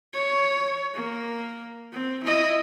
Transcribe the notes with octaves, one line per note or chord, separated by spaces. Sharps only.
C#5
A#3
C4
E4 D#5